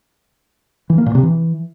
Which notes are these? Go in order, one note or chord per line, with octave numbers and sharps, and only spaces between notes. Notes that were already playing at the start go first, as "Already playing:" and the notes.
E3
A#3
A#2
C3
E3